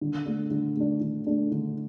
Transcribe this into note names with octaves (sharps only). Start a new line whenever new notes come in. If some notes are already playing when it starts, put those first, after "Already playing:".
D3
A3 D4
D3
A3 D4
D3
A3 D4
D3